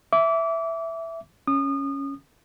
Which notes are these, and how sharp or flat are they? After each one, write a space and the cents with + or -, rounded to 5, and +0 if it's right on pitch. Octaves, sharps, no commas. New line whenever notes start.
E5 +0 D6 -25
C#4 +0 D#6 -30